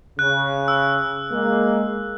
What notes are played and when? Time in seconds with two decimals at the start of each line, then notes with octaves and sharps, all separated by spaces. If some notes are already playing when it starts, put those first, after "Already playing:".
0.19 C#3 F#6
0.68 E6
1.32 G#3 A#3